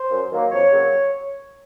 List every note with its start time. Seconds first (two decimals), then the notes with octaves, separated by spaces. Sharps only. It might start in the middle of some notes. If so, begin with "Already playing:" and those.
Already playing: C5
0.11 F#2
0.31 D#3 F#3 A#3
0.52 F2 C#5
0.72 C#3 F#3 A#3